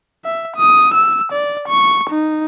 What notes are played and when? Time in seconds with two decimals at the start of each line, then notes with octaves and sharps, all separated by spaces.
0.25 E5
0.57 D#6
0.94 E6
1.33 D5
1.69 C#6
2.10 D#4